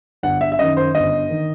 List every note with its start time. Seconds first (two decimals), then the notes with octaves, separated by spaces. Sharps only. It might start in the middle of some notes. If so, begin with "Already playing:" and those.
0.23 G1 F#5
0.41 E5
0.52 E5
0.59 F#2 D#3 D#5
0.77 C5
0.95 G1 D#5
1.30 D#3